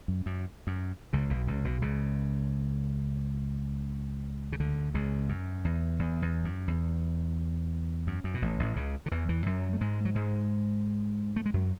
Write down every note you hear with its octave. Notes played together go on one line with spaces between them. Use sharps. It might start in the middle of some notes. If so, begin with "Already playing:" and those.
F#2
F#2
F#2
C#2 C#3
B1 B2
C#2 C#3
B1 B2
C#2 C#3
C#3
D2 D3
C#2 C#3
F#2
E2
E2
E2
F#2
E2
F#2
F#2
B2
A1 A2
A1 A2
C#2 C#3
D3
E2 E3
E2 E3
F#2 F#3
A3
G#2 G#3
F#3
G#2 G#3
A3
G#3
F#2 F#3